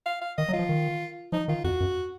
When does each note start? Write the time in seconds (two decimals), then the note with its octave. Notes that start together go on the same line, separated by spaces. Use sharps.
0.06 F5
0.22 F5
0.37 D#3 D#5
0.48 F#3
0.53 F4
0.59 F3
0.69 D#3
1.32 F3 D#4
1.48 D#3 F4
1.64 F2 F#4
1.80 F#2